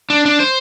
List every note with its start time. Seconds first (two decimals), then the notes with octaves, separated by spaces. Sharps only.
0.10 D4
0.26 D4
0.40 C5